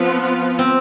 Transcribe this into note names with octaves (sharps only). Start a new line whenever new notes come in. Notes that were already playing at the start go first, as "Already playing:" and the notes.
Already playing: F3 B3 C4 F4
C4